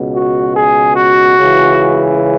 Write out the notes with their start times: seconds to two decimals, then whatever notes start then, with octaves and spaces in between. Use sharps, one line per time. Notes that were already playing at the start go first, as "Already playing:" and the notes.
Already playing: C#2 B2
0.15 F#4
0.56 G#4
0.96 F#4
1.38 C#2 C#3 E3